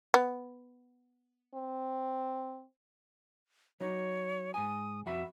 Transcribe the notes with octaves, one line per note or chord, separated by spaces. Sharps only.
B3
C4
F#3 D#4 C#5
G#2 G#5 D#6
F2 F#4 E5 B5